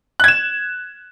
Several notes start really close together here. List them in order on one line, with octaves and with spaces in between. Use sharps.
F#6 G#6 E7